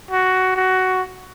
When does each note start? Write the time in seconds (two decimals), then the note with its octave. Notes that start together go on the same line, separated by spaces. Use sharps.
0.11 F#4
0.56 F#4